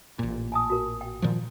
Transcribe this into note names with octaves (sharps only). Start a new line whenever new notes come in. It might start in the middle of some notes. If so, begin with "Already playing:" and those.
A1 A#2
G#5 A5 D#6
F#4 A#4
G5
A#2 D#3 F3